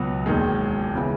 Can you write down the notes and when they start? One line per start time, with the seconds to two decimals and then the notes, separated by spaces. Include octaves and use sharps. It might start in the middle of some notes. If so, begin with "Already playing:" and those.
Already playing: C#2 B2 F#3 B3 F#4
0.26 E1 D#2 D#3 G#3
0.95 C#3 E3 G#3 B3